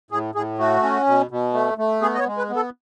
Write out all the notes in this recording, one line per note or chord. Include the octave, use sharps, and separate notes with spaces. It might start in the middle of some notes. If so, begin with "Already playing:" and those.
A2 G#4
A2 G#4
A3 F#4
C#4
B2
B2
A3
A3
B3 G#4
D#5
C#5
G#3
B4
B3
A4